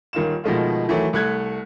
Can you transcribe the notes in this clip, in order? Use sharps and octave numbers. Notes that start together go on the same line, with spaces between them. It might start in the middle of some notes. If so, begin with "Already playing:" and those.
D#1 D#3 F4 E7
B2 D#3 F3 G#3 A3 F4
D#3 E3 F#3 A3
C2 A3 F#6 G#6